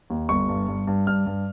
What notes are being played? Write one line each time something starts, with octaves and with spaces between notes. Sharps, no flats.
D#2
G1 C#6
G2
G2
G2
G2 F6
G2